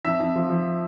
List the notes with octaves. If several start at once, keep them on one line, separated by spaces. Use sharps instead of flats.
F2 E5
F2
F3
F3